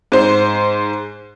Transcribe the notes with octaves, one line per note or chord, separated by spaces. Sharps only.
G#2 C5